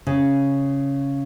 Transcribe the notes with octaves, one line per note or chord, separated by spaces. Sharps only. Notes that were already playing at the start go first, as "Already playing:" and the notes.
C#3